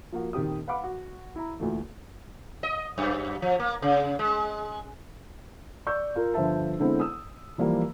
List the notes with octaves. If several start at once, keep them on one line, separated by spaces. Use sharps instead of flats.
F3 A#3 F#4
D#1 D#3 C4 G4 D#6
B4 F5 F#5 B5 D6
F#4
E4 A#5
D2 A#2 E3 A3
D#5
F#2
F3
A#3
C#3
G#3
D5 C#6 E6 G6
F4 A#4
G1 F3 C5 E5 A5
D3 G#3 B3 C4 E4
D#6 E6
E3 F3 G3 A#3